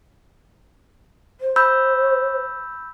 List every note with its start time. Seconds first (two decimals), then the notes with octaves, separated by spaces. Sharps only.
1.40 C5
1.56 B5 E6 G6